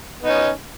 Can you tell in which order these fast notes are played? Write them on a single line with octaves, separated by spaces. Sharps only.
B3 D#4 C#4